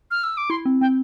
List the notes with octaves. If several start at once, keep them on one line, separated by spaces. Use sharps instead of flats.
F6
E6
D6
E4 C6
C4
C4 G5